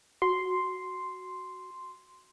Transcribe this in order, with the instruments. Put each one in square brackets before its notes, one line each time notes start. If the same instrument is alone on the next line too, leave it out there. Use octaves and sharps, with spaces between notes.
[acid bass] F#4 [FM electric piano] C6